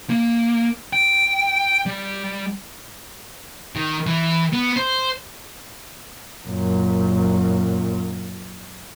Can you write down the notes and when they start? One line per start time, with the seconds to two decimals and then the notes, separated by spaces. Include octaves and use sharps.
0.10 A#3
0.93 G5
1.86 G3
3.76 D#3
4.07 E3
4.53 B3
4.76 C5
6.45 F#2 A#2